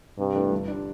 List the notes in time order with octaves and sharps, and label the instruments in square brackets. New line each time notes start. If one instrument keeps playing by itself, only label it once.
[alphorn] G2 [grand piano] C3
[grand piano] E3 A3 D4 A4
G1
G3 D4